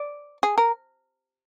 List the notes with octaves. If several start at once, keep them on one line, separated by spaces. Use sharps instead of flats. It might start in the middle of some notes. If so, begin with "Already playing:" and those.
Already playing: D5
G#4
A#4